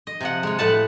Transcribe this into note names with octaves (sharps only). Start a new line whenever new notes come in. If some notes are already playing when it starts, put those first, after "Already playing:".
D#5
C3 F3 F#5
G#3 C#5
A2 B4 F#5 A5